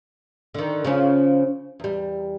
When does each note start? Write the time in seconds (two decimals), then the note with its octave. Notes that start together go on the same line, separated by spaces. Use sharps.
0.54 D3 D#3
0.85 C#3 F3 C#4
1.80 E2 G3